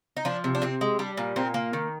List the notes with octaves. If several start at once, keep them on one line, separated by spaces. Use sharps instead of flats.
D#4
F3 D4
C3
D4
C3 C4
G#3
G3 D4
A#2
A#2 C4
A#3
D#3